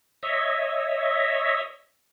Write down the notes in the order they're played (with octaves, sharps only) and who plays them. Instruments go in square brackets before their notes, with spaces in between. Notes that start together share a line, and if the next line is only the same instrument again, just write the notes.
[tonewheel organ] C#5 D#5 E5